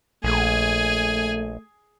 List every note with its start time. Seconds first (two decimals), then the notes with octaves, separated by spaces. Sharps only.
0.24 A#1 A3 G#4 G#5